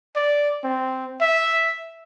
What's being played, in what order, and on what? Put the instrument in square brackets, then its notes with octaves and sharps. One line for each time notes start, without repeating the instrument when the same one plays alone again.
[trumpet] D5
C4
E5